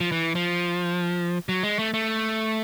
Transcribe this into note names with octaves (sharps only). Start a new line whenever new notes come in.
F3
E3
F3
F#3
G#3
A3
A3